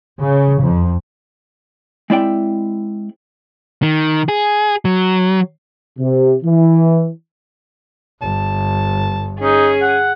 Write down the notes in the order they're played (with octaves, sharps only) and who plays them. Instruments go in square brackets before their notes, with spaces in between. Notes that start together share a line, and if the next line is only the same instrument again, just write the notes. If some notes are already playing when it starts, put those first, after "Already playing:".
[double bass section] C#3
F2
[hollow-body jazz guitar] G#3 C4 E4 D5 E5 G5
[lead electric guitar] D#3
G#4
F#3
[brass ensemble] C3
E3
[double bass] G1 [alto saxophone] A5
[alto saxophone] C#4 [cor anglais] D#4 [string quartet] G#4
[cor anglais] F#5